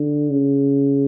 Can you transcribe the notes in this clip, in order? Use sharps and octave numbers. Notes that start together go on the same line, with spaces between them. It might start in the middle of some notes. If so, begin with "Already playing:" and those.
Already playing: D3
C#3